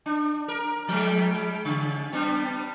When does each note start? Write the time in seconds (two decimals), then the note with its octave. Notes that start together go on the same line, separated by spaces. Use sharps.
0.06 D4
0.48 A#4
0.88 F3 G3 G#3
1.65 C#3
2.12 G3 B3 D4